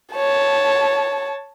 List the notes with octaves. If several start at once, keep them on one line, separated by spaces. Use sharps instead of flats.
C#5 A5